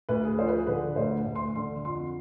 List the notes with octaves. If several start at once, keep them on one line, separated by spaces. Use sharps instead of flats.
D2 B4
G#4
F3 C5
B4
G#4
D3 B4
D2 C5
D2
C6
D3 C6
F2 C6